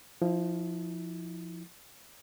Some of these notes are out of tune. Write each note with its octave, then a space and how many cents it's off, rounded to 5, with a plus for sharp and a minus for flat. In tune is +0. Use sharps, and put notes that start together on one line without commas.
F3 +0 E4 -35